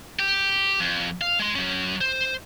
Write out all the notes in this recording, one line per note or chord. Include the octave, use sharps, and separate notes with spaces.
G4
F2
F5
G#3 C6
F#3 C#4
C5